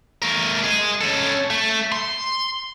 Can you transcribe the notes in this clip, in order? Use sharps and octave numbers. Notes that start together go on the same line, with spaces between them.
A3 A#4
G#4 D#5
C#4 A4
A3
C6